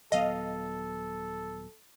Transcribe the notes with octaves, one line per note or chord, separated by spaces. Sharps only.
D#1 F#3 B3 A4 D#5 F5